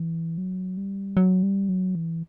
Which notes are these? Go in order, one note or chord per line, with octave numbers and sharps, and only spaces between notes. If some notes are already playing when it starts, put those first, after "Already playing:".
Already playing: E3
F#3
G3
F#3
G3
F#3
E3